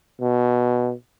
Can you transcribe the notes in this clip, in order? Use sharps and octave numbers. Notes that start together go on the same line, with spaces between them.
B2